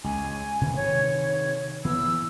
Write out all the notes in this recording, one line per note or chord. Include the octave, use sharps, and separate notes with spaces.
C#2 G#5
C3 D#3 E3
C#5
E3 B3 E6